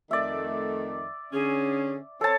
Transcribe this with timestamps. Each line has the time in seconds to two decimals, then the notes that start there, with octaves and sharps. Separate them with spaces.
0.11 F2 D#3 A3 D5 E5
1.33 D3 C#4 G#4
2.21 C4 A4 C#5 A5